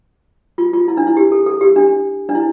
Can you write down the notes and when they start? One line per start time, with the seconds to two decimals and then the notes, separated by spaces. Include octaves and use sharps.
0.58 F4
0.73 F4
0.88 E4
0.97 D4
1.07 E4
1.17 G4
1.32 A4
1.46 A4
1.61 G4
1.76 D4
2.29 D4
2.35 E4